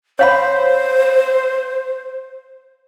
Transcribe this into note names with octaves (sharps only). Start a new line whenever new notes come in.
C5 C#5 F5 B5